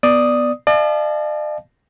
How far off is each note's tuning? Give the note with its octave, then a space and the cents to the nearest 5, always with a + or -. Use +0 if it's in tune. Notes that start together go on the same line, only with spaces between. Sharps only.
B3 +0 D5 +10 D#6 +0
D5 +45 F5 -40 A5 -30